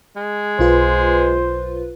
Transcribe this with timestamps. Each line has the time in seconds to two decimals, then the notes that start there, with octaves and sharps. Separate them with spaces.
0.16 G#3
0.59 B1 F4 B4 C5